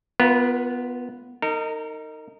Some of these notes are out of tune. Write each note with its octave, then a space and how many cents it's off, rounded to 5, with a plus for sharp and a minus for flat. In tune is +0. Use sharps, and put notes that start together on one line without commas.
B3 +0 F4 -10 A#4 +40
D#4 +0 A#4 -35